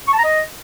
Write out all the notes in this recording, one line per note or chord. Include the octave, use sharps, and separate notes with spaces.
C#6
A5
A#5
D#5